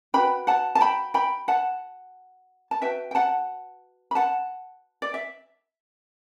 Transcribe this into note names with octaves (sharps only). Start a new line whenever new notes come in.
D4 F#4 B4 G5 B5
F#5 A5
A5
G5 B5
G5 B5
F#5 A5
A5
F#4 B4 E5 G5
G5
F#5 A5
B5
F#5 A5
D5
E5